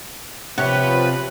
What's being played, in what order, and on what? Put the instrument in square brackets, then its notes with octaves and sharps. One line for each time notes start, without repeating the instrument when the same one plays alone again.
[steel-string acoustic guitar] C3 [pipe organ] F3 B4 [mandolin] G4 C#5 F#5